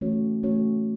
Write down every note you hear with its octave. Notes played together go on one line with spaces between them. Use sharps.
E3 A3 C#4 F#4 C#5
E3 A3 C#4 F#4 C#5